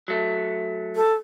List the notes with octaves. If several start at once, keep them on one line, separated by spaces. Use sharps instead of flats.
F#3 A3
A4